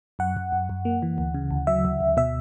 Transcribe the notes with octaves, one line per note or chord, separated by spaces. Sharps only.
F#2 F#5
F#2
F#2
F#2
A#3
E3
D2
C#3
D2
F#3 E5
D2
D2
B2 E5